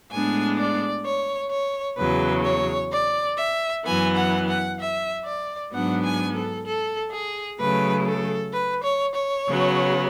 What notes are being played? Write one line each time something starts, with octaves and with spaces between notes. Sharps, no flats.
A2 G#3 B3 D4 G#5
D5
C#5
C#5
E2 C#3 F#3 B4
C#5
D5
E5
F#2 E3 B3 G#5
F#5
F#5
E5
D5
G#2 F#3 B3 D4 F#5
G#5
A4
A4
G#4
C#3 F#3 A3 B4
A4
B4
C#5
C#5
C#3 F#3 B3